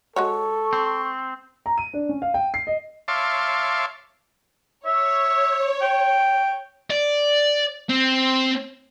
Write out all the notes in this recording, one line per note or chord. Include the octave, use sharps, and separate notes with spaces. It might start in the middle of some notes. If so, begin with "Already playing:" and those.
G#3 F#4 A4 C#5 C#6
C4
A#5
D#7
D4
C#4
F5
G5
C7
D#5
C#5 E5 F5 A5 C6 D6
C#5 E5
G5
D5
C4